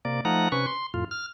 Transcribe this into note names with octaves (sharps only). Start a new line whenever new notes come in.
C3 A#3 D5
F3 A3 D#4 F#5 A#5
C3 C#4 B4 C#6
C6
F2 A2 F4
F6